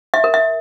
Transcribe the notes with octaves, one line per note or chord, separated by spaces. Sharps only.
E5
A#4
E5